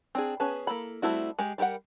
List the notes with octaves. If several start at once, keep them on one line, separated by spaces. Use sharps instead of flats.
C4 D4 G#4
B3 C#4 G#4 B4 A5
A#3 C#4 E4 A4 B5
G3 A3 C4 E4 F#4
G#3 G4
G3 G4 A#4 F5 F#5